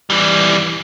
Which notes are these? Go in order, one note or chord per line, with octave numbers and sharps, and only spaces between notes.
E3 G3